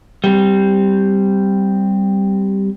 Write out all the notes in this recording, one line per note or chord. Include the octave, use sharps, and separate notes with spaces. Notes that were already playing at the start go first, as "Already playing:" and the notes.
G3 C4